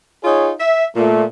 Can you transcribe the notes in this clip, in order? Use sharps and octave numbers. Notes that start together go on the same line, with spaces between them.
D#4 F4 G#4 C#5
E5
A#2 A3